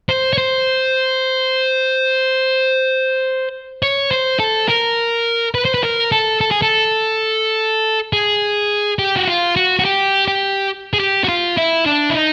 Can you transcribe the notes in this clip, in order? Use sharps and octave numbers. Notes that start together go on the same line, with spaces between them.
C5
C#5
C5
C#5
C5
A4
A#4
B4
C5
B4
A#4
A4
A4
G#4
A4
G#4
G4
F#4
F4
F#4
F#4
G4
G4
G#4
G4
F#4
F4
E4
D4
E4
D#4